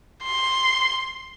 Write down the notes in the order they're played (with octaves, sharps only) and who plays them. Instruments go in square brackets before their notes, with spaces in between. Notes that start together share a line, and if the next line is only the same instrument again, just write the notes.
[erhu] C6